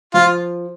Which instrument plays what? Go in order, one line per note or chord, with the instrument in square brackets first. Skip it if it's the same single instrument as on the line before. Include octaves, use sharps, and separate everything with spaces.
[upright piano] F3 [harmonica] F4